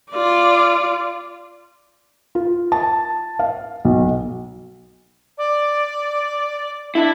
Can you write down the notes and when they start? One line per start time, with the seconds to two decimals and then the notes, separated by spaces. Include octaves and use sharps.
0.12 F4 D5
2.35 F4
2.72 A5
3.39 F5
3.85 B1
5.38 D5
6.95 D4 E4